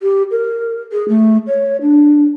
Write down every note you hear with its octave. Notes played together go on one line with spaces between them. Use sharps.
G4
A#4
G#4
A3
C#5
D4